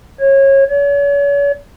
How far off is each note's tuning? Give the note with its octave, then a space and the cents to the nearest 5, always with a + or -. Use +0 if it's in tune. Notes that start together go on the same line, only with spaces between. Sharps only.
C#5 -25
C#5 +40